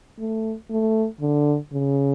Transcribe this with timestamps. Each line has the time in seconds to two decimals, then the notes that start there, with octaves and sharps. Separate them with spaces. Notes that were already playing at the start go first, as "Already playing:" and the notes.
0.19 A3
0.70 A3
1.21 D3
1.73 C#3